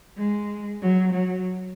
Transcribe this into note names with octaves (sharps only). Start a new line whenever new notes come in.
G#3
F#3
F#3